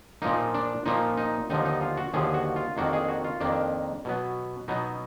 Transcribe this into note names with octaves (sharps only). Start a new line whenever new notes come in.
A#2 F3 A#3 D#4
D4
A#2 F3 A#3 D#4
D#4
D#2 D3 F3 D#4
D#4
F4
F#4
D#2 D3 F3 G#4
F#4
F4
F2 D#3 A#3 D4 F#4
G#4
F#4
F4
F2 D#3 A#3 D4
B2 F#3 B3
B2 F#3 B3 D#4